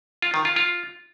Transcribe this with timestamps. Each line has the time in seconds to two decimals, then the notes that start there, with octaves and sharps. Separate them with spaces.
0.22 F4
0.34 D#3
0.45 F4
0.56 F4